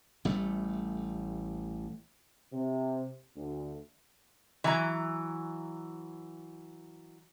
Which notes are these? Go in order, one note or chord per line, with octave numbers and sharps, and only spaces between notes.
A1 G3 A3
C3
D2
E3 F#3 A#5